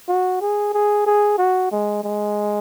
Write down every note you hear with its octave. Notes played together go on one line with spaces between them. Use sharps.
F#4
G#4
G#4
G#4
F#4
G#3
G#3